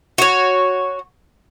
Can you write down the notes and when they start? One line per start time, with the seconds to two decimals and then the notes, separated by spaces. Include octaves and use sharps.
0.18 F#4 C#5